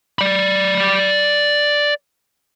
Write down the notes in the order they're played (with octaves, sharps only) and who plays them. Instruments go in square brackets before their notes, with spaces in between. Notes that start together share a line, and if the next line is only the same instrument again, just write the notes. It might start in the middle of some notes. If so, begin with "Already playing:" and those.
[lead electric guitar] D5 B5